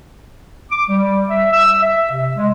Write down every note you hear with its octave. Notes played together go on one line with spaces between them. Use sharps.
D6
G3
E5
E6
E5
C3
G#3